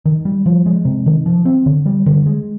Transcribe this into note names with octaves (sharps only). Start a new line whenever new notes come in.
D#3
G3
F3
G#3
C3
D#3
F3
C4
D3
G3
D3
G#3